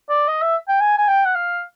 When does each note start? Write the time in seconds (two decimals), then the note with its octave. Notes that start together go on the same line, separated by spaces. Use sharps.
0.09 D5
0.28 D#5
0.42 E5
0.68 G5
0.81 G#5
0.98 G#5
1.08 G5
1.26 F#5
1.35 F5